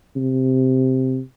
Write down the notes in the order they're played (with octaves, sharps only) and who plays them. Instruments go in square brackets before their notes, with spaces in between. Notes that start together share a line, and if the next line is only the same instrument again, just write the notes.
[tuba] C3